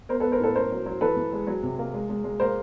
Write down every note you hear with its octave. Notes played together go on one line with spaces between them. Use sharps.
B3 A#4 C5
A4 B4
B3
A#4 C5
A2 A4 B4
C#4 A#4 C5
F#3
F#3
E3 A4 B4
E3
G#3
F#3
C3
A#3
G#3
G#3
G#3
A#3 A#4 C5